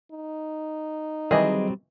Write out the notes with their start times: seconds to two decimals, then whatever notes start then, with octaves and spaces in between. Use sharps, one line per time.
0.12 D#4
1.31 D#3 E3 F#3 G3 C4 G#4 D#5